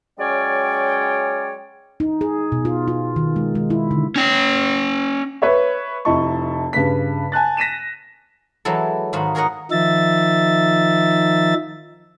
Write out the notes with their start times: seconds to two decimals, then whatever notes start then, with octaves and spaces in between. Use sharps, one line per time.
0.19 F#3 G#3 C#4 C#5 D5 G5
2.00 D#4
2.21 G#4
2.52 B2
2.65 F4
2.88 F4
3.16 D#3
3.36 G#3
3.55 G#3
3.70 E4
3.91 D3
4.16 C#4 G5
5.42 B4 C#5 E5
6.05 F1 E4 D#5 A5 C#6
6.73 G2 C#3 B4 B6
7.32 G#5 A5 F#6 A6
7.57 A#6 B6 D#7 E7
8.65 E3 F#3 G#3 E4 A4
9.13 G#2 D#3 F4 F#4 B5
9.35 G#4 A#4 C#5 D#5 F#5
9.71 D#3 F3 D#4 E5 A6